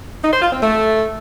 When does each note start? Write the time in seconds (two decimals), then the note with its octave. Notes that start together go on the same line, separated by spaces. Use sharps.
0.23 D#4
0.32 C5
0.42 F4
0.51 C4
0.61 A3